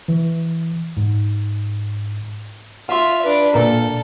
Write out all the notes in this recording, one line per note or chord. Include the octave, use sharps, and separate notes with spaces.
E3
G#2
F4 E5 F5 C6
D4 B4
A#2 A4 A#4